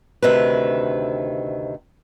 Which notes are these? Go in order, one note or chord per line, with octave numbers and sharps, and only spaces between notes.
D2 C3 D#3 E4 B4